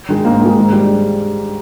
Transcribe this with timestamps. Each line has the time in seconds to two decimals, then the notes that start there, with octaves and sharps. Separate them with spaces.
0.09 D#3 G#3
0.24 G#2 A#3
0.40 D#3
0.45 G#3
0.57 G#2
0.72 G3